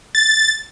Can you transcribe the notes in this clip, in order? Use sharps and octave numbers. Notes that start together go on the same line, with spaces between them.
A6